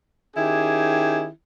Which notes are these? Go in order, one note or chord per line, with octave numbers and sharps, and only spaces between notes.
D#3 C#4 E4 G4 G#4